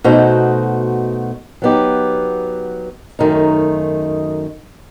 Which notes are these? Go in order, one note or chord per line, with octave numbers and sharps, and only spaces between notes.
B2 A3 D#4 F#4 C5
F#3 B3 D#4 G4
F#2 D#3 A3 D#4